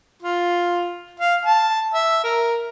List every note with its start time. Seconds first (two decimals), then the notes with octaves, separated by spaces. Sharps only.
0.22 F4
1.20 F5
1.45 A5
1.94 E5
2.24 A#4